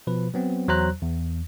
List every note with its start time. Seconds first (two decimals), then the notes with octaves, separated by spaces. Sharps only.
0.07 B2 F3 B4
0.34 F#3 B3 C4
0.68 E2 F#3 C5 A#5 F#6
1.02 E2